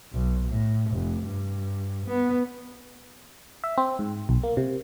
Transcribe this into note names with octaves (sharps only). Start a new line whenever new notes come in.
B1
A2
F1
G2
B3
E5
C4
G#2
B1
A#3
C3